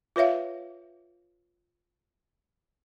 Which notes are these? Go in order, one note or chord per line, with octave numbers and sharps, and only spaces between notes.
F4 B4 C#5 E5 F5